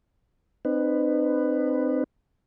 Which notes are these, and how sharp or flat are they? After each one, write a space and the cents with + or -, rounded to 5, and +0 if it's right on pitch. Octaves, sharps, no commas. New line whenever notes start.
C4 +0 D#4 -35 B4 +10